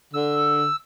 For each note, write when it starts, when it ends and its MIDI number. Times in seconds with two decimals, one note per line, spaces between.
0.14 0.68 50
0.14 0.76 88